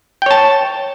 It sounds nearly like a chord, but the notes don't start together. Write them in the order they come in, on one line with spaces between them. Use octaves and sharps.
G5 C#5 A5